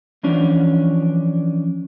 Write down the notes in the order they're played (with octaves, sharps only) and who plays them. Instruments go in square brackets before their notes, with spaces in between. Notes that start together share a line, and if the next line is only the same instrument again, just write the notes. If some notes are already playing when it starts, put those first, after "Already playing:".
[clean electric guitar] E3 F3 C#4 D4